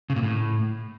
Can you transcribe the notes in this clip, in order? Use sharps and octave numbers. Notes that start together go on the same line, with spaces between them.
C#3
A#2
A2